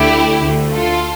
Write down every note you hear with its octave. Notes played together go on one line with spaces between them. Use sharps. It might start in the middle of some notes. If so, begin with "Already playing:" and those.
Already playing: D2 D3 A3 E4 G4
D2 D3 A3
F4 A4